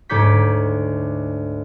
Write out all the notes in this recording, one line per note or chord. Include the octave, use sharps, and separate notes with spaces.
D2 G#2 C#5 D6 G6 B6